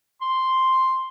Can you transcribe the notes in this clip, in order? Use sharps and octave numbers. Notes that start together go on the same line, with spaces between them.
C6